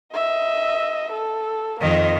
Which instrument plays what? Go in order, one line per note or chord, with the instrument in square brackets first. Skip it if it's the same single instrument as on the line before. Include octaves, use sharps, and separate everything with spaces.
[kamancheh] D#5 E5
A4
[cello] F2 D#3 [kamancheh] A#3 D#5